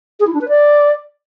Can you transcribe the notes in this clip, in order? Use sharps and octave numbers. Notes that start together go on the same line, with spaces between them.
G#4
E4
D4
B4
D5